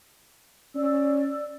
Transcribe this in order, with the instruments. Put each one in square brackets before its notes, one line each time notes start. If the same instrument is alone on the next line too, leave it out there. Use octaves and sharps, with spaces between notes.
[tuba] C#4 [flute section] D5 E6